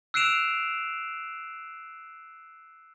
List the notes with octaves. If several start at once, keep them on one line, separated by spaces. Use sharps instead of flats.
E6 F#6 C7 D7 E7 F7